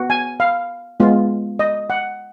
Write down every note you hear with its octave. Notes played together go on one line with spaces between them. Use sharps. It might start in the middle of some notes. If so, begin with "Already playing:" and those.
Already playing: B3 F#4
G#5
F5
G#3 B3 F4
D#5
F#5